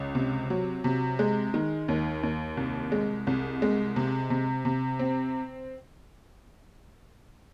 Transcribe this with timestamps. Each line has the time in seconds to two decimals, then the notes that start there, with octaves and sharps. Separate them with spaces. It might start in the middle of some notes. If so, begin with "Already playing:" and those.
Already playing: C#2
0.15 C3
0.50 F#3
0.84 C3
1.19 G#3
1.54 D#3
1.88 D#2
2.23 D#2
2.57 C2
2.92 G#3
3.27 C2
3.62 G#3
3.96 C3
4.30 C3
4.65 C3
4.99 C4